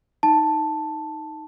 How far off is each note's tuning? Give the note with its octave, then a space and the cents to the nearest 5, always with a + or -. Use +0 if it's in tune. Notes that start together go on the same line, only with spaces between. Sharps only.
D#4 +5 A5 +0